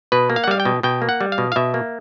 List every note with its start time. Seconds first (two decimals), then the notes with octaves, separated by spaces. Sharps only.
0.12 B2 B4
0.30 A#3
0.36 F5
0.44 F#5
0.48 G3 F5
0.60 G5
0.65 B2
0.83 B2 G5
1.02 A#3
1.09 F#5
1.21 G3
1.32 F5
1.38 B2
1.52 F5
1.56 B2 E5
1.74 A#3